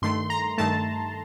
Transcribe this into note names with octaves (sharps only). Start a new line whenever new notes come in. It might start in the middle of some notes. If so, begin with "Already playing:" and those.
G2 D#3 A3 C6
A#5
G2 D#3 A3 A5